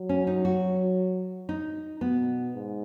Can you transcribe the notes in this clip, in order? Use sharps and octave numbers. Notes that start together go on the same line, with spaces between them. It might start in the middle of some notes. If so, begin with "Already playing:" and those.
Already playing: F#3
C#4
D#4
F#4
D#4
B2 B3
G#2